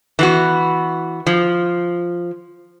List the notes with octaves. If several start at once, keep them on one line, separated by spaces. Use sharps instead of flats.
E3 B3 F#4
F3